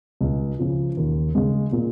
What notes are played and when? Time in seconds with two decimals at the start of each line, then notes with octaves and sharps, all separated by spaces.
0.21 C#2
0.59 C#3 F3
0.97 D#2
1.35 C#3 G#3
1.72 A#2